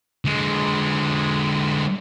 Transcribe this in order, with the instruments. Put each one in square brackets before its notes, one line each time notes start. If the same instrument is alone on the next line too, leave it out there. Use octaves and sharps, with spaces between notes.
[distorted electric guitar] D3 G#3